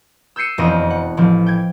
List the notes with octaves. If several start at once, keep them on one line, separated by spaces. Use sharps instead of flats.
E6 G6 G#6 C7 C#7 D#7
E1 F2 F3 D#5 A#6 D#7
F#5
A1 F3
G5 G#6